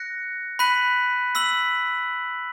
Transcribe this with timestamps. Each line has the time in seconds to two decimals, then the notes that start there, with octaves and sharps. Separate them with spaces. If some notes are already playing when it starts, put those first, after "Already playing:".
Already playing: F#6 A#6 C#7
0.59 B5 F#6 B6 D#7 F#7
1.35 E6 B6 F#7